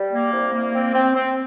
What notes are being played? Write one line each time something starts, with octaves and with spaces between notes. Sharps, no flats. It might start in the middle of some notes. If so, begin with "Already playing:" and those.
Already playing: G3
A#3
C2
A#3
C4
C4
C4